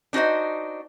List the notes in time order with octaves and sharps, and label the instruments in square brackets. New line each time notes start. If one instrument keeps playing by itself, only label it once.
[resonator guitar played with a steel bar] D4 D#4 F#4 C5 D#5